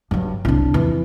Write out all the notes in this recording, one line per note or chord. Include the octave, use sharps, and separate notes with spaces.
G2 F#3
C2 D4
F2 E3